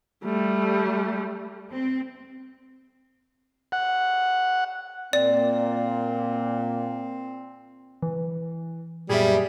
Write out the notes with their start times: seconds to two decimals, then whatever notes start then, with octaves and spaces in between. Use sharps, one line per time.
0.24 G3 A3
1.71 C4
3.72 F#5
5.13 A#2 C4 D5
8.03 E3
9.09 F#2 A#2 G3 B3 G#4 E5